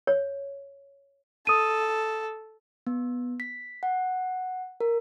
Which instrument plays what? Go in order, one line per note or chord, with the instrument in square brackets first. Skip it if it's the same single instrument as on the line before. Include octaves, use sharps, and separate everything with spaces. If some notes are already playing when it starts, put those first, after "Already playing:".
[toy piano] C#5
[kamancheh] A4 [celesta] D#6 D#7
[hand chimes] B3
B6
F#5
A#4